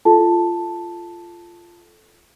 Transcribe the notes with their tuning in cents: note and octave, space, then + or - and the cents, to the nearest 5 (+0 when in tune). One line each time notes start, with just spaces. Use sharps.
F4 -15 A4 -15 A5 +0